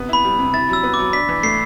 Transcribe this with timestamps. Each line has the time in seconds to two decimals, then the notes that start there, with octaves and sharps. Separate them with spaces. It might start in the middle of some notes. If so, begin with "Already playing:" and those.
Already playing: C3 B3
0.09 E4 B5
0.24 G3
0.39 C3
0.54 E4 A6
0.69 F#3 E6
0.83 B3
0.94 D6
0.99 F#3
1.13 D4 B6
1.29 E3
1.43 A3 C7